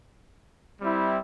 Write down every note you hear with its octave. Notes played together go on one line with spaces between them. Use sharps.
G3 C4 E4